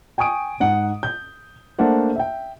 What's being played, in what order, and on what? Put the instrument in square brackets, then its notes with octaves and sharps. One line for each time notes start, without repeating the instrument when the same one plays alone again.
[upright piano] G5 G#5 C#6 D#6 D7
G#2 F#5
G6
A3 A#3 D4 C5 F#5
E5 G5